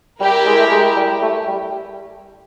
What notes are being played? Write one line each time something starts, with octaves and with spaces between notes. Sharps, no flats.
G3 E4 G4 A#4
G#3
A3
G#3
G3
A3
G3